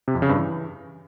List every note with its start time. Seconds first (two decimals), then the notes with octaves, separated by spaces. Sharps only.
0.08 C3
0.15 F2
0.22 C#3
0.29 G2
0.36 E3